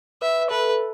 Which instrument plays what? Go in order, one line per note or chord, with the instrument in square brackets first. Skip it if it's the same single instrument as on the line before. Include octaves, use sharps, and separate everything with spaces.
[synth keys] B4 [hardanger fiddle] E5
[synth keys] A4 [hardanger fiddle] B4